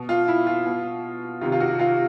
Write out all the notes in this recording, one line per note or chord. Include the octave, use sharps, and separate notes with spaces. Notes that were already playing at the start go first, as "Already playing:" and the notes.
Already playing: B2
F4
E4
F4
B2
C3 D#3 F4
F4
F#4
F4